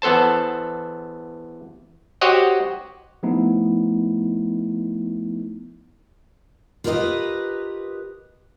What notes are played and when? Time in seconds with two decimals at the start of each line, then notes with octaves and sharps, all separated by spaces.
0.02 E2 B3 A4 C5 A5
2.21 F#4 G4 C5 C#5 D#5 F#5
3.23 F3 A3 B3 D#4 E4
6.84 F4 G4 A#4 B4 D#5